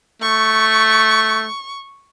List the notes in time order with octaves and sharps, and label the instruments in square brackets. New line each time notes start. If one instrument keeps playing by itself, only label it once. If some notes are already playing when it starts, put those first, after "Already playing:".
[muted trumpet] A3 [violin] C#6